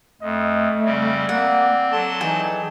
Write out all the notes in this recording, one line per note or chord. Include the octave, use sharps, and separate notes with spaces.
F2 A3 D#5
C#3 G3 C4 D5
A#3 C4 F#5
F#3 A4 A5 C6
E3 D#4 G#4 G5